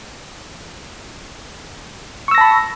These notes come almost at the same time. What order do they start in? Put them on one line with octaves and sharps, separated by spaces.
C#6 E6 A#6 A5 B5